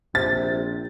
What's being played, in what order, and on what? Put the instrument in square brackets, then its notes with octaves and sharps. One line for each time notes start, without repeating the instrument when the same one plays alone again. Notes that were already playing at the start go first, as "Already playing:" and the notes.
[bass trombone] A#1 [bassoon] C3 [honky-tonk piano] A6